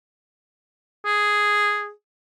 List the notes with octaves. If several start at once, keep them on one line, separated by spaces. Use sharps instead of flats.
G#4